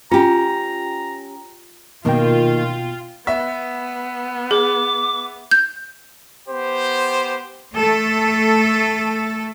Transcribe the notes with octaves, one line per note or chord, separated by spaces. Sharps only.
C#4 F4 G4 A#5
B2 D#3 A#3 F4 G5
B3 E5
G#4 D6
G6
B3 G4 C5
A3 A4